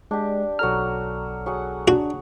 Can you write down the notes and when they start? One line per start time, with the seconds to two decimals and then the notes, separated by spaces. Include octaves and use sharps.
0.11 G#3 D4 G4
0.59 B1 F#3 A4 A#5 F6
1.46 F#3 G#4 F#5
1.88 D4 F#4